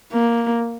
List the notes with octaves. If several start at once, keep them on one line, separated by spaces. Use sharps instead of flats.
A#3